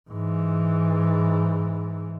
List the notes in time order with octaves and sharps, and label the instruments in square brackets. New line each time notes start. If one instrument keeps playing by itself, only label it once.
[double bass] G#2 E3